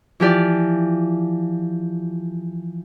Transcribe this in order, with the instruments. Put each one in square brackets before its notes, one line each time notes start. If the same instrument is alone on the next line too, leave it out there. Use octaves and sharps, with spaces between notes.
[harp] E3 F3 G4 D5